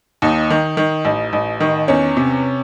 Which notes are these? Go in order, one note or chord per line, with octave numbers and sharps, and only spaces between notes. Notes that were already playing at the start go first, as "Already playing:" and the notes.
D#2 D#4
D#3
D#3
A1
A1
D#3
E2 C#4
C3